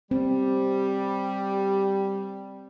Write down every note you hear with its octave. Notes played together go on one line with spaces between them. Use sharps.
G3 C4